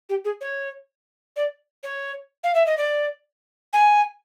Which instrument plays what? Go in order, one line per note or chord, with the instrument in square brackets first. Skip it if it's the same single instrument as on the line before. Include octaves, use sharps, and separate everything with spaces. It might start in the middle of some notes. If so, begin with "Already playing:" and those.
[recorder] G4
G#4
C#5
D5
C#5
F5
E5
D#5
D5
G#5